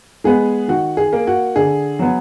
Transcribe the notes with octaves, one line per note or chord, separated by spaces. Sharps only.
G#3 B3 G#4
D#3 F#4
G#4
A#3
F#4
D3 G#4
F#3 B3